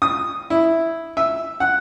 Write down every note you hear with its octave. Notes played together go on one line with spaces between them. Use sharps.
D#6
E4
E5
F#5